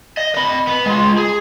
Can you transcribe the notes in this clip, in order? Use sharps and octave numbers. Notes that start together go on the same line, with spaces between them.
D#5
D#5 B5
B3
G#3 F4
G#4